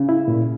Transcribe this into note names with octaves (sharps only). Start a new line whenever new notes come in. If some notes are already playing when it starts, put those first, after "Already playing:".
Already playing: C#3
E4
A#2